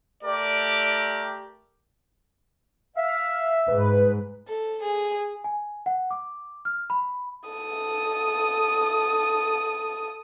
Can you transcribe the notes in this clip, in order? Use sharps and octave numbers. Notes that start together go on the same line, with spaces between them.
A3 G4 A#4 D5
E5 F5
G#2 B4
A4
G#4
G#5
F#5
D6
F6
B5
A4 D#6